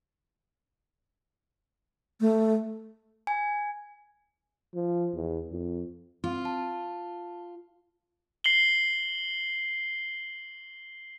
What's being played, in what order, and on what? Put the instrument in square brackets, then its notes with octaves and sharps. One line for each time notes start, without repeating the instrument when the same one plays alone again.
[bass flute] A3
[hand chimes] G#5
[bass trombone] F3
E2
F2
[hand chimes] C4 [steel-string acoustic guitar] F4
[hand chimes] A5
[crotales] C7 F#7 G7